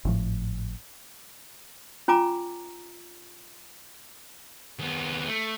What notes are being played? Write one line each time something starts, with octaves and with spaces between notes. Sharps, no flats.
G#1 A2 F3
C#4 F4 G#5 A#5 D6
D#2 B3
A3